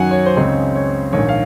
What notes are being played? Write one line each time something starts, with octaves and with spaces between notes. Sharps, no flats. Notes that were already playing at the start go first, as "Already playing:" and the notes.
Already playing: F#2 D#3 F#3 F#5 G#5
C#5
C5
C#2 C#3 G#3 C4 D#4 C#5
C#5
A#1 G#2 D#3 C#5
F5